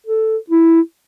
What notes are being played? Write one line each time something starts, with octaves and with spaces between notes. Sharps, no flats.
A4
E4